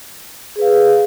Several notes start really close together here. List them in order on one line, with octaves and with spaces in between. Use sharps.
G#4 B4 F5